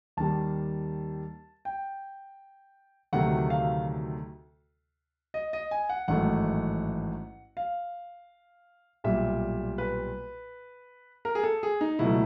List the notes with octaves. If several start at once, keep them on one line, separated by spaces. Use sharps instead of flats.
D#2 D#3 G3 A5
G5
D2 C3 D#3 F#3 A3 F#5
F5
D#5
D#5
G#5
F#5
A1 G#2 D#3 F#3 A3 F#5
F5
B1 A#2 G3 E5
B4
A#4
G#4
A4
G#4
D#4
C#2 B2 F#3 A3 E4